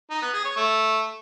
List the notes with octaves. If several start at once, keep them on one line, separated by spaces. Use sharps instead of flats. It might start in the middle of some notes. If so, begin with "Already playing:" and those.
D#4
B3
G#4
C#5
A3